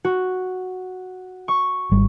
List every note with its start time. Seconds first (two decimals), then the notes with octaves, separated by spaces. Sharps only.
0.04 F#4
1.48 C#6
1.91 G#1 G3